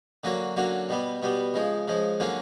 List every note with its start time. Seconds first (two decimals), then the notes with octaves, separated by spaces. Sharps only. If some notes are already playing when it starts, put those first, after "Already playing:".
0.24 D3 F#3 A#3 C#4 F#4
0.56 D3 F#3 A#3 C#4 F#4
0.89 B2 G3 B3
1.22 B2 G3 B3
1.54 C#3 F3 G#3
1.88 C#3 F3 G#3
2.20 D3 F#3 A#3 C#4 F4